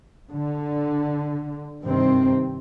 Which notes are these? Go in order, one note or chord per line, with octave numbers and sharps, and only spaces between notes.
D3
G2 C3 D#3 C4